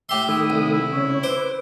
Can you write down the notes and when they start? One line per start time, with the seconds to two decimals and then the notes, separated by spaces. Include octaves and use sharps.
0.09 A2 G4 E5 C6
0.29 D#3 A3 E4 D#6
0.50 C2
0.73 E4
0.93 C#3 C#5
1.23 B4 C5 D6